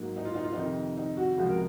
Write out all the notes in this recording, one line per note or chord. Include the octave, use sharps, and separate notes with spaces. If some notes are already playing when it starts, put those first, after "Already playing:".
Already playing: G#2 F#3 A#3
D#4
F4
D#4
F4
F2 C3 D#3 D#4
D#4
F#4
C#2 C3 F3 G#3 F#4
A#4